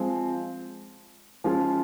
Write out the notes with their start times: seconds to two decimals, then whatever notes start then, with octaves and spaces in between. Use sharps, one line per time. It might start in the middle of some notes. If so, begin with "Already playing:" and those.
Already playing: F3 G#3 C4
1.44 F3 G#3 C#4 F4